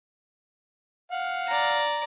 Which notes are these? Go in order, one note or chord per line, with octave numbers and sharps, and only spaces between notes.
F5 F#5
D5 A#5